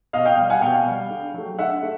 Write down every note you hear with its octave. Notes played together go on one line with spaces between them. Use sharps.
B2 D#5 F5
F5 G5
G3
F#5 G#5
B2 F5 G5
G3
D3
F#3 A3
D3 E5 F#5
A3